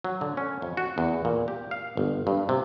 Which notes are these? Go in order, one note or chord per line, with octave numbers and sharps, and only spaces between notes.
F#3
D3
C#4
F2
F#4
E2
A#2
G4
F5
G1
G2
C3